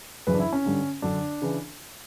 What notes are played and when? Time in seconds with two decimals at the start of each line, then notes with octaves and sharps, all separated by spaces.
0.27 F#2 C#3 E3 B4
0.34 D4
0.40 E4
0.53 C#4
0.65 G2 D3
1.02 F#2 D3 D4
1.42 C#3 E3